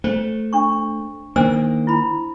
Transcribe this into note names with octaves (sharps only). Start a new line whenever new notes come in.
A3 C5
D4 C#6
D#3 A#3 D4 C5 E6
E4 B5